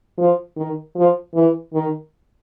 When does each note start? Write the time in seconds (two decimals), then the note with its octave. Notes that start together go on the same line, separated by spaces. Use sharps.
0.18 F3
0.57 D#3
0.96 F3
1.35 E3
1.74 D#3